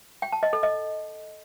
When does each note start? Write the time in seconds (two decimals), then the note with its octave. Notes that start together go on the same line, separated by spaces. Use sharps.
0.22 G5
0.32 A5
0.43 D#5
0.53 A4
0.63 D#5